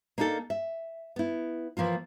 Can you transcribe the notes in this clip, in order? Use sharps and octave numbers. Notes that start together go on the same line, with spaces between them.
A#3 D4 D#4 G#4 A4
E5
B3 E4
E3 F3 A#3 F4